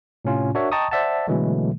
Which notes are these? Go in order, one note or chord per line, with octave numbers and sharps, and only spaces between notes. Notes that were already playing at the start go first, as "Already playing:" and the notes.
A2 C3 C#4 F4
D4 F#4 A#4 C#5 E5
D#5 G5 A5 A#5 C#6 D#6
C5 D5 E5 F#5 A5
B2 D3 E3 F#3 G#3 A3